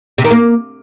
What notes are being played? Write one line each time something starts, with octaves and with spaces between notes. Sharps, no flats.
C3
D#3
A#3